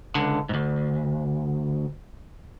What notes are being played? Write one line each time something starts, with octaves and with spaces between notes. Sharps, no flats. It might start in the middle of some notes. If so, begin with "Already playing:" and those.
C#2 D3
D2 G#2